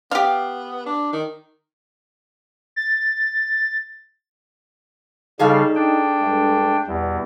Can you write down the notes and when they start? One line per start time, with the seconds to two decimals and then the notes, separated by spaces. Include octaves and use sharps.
0.11 B3 G4 F5
0.86 D4
1.13 D#3
2.76 A6
5.39 C#3 G3 D#4 G#4 A4 F5
5.76 D4 G5
6.20 G2 G#3 A3
6.87 E2 B2 G3 E4